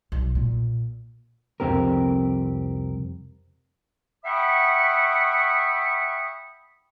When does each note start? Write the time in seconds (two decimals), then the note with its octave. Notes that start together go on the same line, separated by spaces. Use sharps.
0.12 B1
0.35 A#2
1.60 C2 F2 C4 G4 A#4
4.25 E5 F#5 G5 B5 C#6 D#6